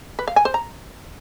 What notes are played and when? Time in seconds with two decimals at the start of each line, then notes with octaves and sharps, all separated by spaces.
0.19 B4
0.28 F5
0.36 G#5
0.45 C5
0.54 A#5